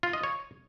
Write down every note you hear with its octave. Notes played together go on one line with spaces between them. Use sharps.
F4
D#5
C#5